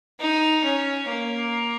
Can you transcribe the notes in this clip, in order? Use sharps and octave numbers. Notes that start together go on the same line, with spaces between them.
D#4
C#4
A#3